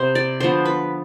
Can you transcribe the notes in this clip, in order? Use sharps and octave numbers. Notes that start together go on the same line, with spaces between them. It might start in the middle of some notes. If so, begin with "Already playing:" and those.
Already playing: C3 B3 C5
D5
D3 F3 B3 C5
B4